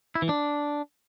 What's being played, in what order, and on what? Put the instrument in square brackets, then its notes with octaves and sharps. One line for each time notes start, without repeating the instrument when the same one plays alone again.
[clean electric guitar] E4
E3
D4